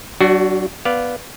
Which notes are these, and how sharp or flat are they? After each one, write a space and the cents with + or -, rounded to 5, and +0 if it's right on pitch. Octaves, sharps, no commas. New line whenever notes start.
F#3 +45 D4 +0 F#4 +0
B3 +0 D5 +5 F5 +0